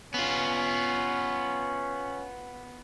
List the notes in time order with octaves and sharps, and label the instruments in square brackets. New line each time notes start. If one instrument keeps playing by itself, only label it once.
[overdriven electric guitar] B3 F4 [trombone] C#4